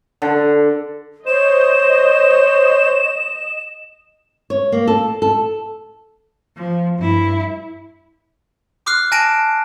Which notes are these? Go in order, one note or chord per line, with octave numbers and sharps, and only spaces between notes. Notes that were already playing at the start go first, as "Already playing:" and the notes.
D3
C5 C#5 D#5 E7
C#5
A#3
A4
A4
F3
G2 E4
C6 D6 D#6 F6 F#6 C7
G#5 A5 A#6 D7 E7